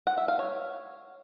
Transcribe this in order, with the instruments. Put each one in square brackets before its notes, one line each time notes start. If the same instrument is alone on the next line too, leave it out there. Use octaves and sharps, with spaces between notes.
[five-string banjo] F#5
E5
F5
C#5